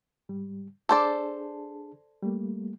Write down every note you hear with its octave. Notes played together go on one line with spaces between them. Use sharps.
G#2 G3
D4 G#4 A4 C5 D5 A5
G3 A3 A#3